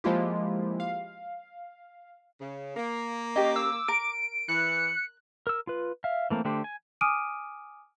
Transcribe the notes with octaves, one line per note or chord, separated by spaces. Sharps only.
F3 G#3 A#3 E4 F4 G4
F5
C#3
A#3
C#4 G4 D#5 D6
E6
A#4 D7
E3 F#6 C#7
A#4 E6
F4 B4
E5 F5
E3 A3 A#3 C4
D3 A3 D4 G4 C5
G#5
G#5 D6 D#6 F6 D7 D#7